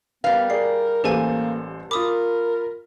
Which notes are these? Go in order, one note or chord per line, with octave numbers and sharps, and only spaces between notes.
G3 B3 A#4 B4 F5
G#4 A#4 D5 C7
A1 A#3 G4 A4 B4 C5 G#5
F4 A#4 B5 D6 D#6